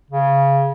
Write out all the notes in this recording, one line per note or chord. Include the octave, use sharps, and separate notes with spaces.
C#3